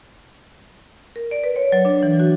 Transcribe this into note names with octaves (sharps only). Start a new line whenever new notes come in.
A#4
D5
B4
C#5
F#3
D4
E3
F#4